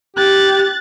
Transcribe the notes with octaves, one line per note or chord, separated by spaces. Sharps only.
G4 F#6 A6